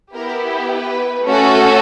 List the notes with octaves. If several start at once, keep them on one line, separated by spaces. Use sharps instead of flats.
B3 E4 G4 A#4
B4
A3 C#4 F#4 A4